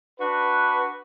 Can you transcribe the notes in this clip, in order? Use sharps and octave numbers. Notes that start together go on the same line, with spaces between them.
D4 F#4 B4